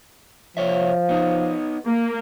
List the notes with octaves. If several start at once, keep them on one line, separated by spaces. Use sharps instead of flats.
C2 F3 C#5 E5
B3 D#4
A#3